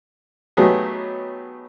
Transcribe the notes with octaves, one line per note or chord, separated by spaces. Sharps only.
F#3 A3 B3 D#4 G4 G#4